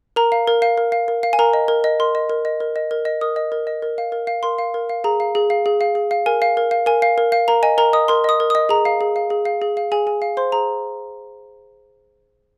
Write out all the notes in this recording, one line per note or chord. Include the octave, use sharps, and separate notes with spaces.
A#4 A#5
F5
A#4
F5
A#4
F5
A#4
F5
G#5
A#4 A#5
D#5
A#4
D#5
A#4 C6
D#5
A#4
D#5
A#4
D#5
A#4
D#5
A#4 D#6
D#5
A#4
D#5
A#4
F5
A#4
F5
A#4 C6
F5
A#4
F5
G#4 A#5
F5
G#4
F5
G#4
F5
G#4
F5
A#4 G#5
F5
A#4
F5
A#4 G#5
F5
A#4
F5
A#4 A#5
D#5 G#5
A#4 A#5
D#5 D#6
A#4 C6
D#5 D#6
A#4
D#5 D#6
G#4 A#5
F5
G#4
F5
G#4
F5
G#4
F5
G#4 G#5
G#4 G#5
F5
C5 C6
G#4 A#5